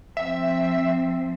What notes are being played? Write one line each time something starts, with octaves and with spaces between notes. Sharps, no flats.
F3 C4 E5